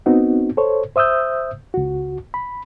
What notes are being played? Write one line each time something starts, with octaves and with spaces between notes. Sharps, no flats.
B3 C4 D#4 F#4
A4 C5 C#5
C5 E5 D#6 E6 G6
C#2 F#4
B5